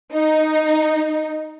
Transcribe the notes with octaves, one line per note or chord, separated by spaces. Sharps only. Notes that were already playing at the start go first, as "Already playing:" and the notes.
D#4